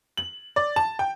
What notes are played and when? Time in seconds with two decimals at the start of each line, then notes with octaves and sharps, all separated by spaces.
0.17 F#7
0.56 D5
0.76 A5
0.99 G5